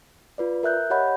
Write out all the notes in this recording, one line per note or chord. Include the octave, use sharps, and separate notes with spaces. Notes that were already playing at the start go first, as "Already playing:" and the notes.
F4 B4 D5
A#4 E5 F#6 G6
G4 C#5 D#5 F#5 B5 G6